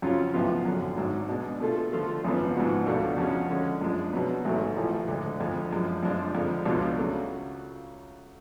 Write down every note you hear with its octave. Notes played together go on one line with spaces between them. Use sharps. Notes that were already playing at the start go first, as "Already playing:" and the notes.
F2 C#3 F#3 C#4 F4
B1 A2 F3 B3 F4
F#2 D3 F#3
G#1 G#2 F#3
B2 G#3 D4
B2 A3 F4 A4
D3 F3 A3 F4 A4
G#1 F#2 C#3 F3 B3
G#2 F3 B3 D4 F#4
C#2 B2 A3 D4 F#4
F2 F3 G#3 C#4 F#4
D3 G#3 C#4
F#2 F3 G#3 D4
B2 F#3 B3
A1 G#2 F#3 A3
A1 A2 F3 A3
D2 D3 G#3
F2 D3 G#3
F#2 F3 G#3
F#2 F3 G#3 D4 F4
F2 D3 G#3
C#2 B2 G#3 D4 F4
C#3 F#3 A3